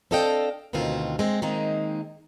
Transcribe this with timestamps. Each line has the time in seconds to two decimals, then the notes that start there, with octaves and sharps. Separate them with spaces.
0.11 C4 D4 A4 D#5 F5 G5
0.73 D2 B2 D#3 C4 F4
1.19 G#3 C4
1.42 D#3 G#3 A#3 C4 D#4